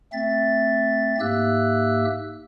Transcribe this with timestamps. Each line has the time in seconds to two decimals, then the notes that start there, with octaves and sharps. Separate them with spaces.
0.13 A3 C4 E5 A6
1.20 G#2 A#3 G4 E5 E6 F#6